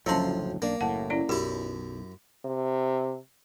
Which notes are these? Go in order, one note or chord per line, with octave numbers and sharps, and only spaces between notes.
F#1 D2 A2 F3 F#3 C#4 A5 C6
B1 A#3 D4
F#1 A2 F#5 A5
C#4 E4 D5
B1 F#2 E4 G4
C3